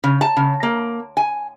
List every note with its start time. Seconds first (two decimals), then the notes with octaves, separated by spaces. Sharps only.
0.04 C#3
0.21 A5
0.37 C#3
0.63 A#3
1.17 G#5